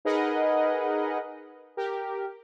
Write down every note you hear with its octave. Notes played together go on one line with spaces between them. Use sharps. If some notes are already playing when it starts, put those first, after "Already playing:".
D#4 G#4 A#4 B4 D#5 F#5
G4 A#4